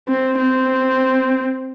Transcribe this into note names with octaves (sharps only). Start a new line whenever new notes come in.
C4
C4